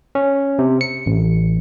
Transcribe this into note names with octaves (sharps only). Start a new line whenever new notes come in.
C#4
C3
C#7
A1